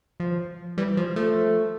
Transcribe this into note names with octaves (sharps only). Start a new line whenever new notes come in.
F3
E3 G3
F3
F3 A3